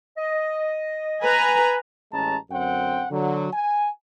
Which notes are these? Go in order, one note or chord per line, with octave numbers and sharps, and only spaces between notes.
D#5
B4 G#5 A#5
A1 G#3 C#4 A5 A#5
F#2 D3 C4 F#5 G5
D3 F#3
G#5